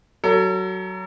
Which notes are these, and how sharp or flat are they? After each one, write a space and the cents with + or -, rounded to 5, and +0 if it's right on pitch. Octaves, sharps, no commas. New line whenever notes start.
F#3 +20 A4 +35